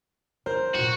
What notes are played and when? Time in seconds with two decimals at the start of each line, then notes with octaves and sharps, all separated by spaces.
0.46 D#3 A#4 C5
0.75 A#2 F4 F#4